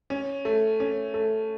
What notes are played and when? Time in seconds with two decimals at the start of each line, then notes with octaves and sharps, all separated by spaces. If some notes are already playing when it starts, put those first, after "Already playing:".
0.10 C#4
0.45 A3
0.80 C#4
1.14 A3